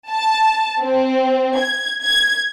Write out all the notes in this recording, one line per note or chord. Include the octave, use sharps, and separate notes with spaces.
A5
C4
G#6
G#6